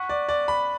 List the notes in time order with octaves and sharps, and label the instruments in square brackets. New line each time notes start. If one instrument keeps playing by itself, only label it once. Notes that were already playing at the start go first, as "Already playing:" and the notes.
Already playing: [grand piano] F#5 [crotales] C#6 F#6 B6
[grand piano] D5
D5
B5